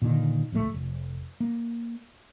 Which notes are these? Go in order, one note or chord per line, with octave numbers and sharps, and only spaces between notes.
A#2 D3 D#3
D1 A#1 A2 A3
F1
A#3